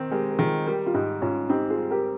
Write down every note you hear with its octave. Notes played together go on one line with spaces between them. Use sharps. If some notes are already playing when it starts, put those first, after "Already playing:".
Already playing: D#3 C4
G#3 G4 A#4
A#4
D#3 F4 G#4
G3 G4 A#4
F4
G#2 D#4 G4
G#2 C#4 F4
C4 D#4 G4
F4 G#4
G3
G4 A#4